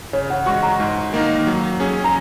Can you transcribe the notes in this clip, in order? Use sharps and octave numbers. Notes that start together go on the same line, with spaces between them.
C#3 C#5
F#5
G#3 F#4 C#6
A#5
G#2
D#3 A#3 D#4
F#3
C#4 G#4
A#5